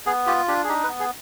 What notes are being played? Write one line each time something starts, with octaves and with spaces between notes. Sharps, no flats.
B3 G#4
F4 G4
D4 G4
G#4
D#4 G4
B4
B3
G#4